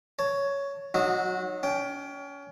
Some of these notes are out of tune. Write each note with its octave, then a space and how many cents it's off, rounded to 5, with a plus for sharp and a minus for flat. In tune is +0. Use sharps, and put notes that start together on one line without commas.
C#5 +10 A5 +20
F#3 +0 D#4 -15 F#4 -30
C#4 +30 G5 +0